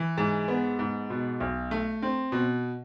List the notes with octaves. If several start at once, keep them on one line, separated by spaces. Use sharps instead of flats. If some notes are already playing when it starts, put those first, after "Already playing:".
Already playing: E3
G#2
B3
G#2
B2
B1
A3
C4
B2